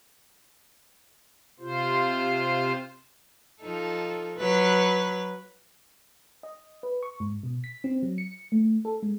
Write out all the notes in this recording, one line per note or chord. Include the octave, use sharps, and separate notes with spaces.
C3 F4 C5
F3 D#4 A4
F#3 B4
D#5
B4
C#6
G#2
B2
B6
C4
F#3
C#7
A3
A4
G#3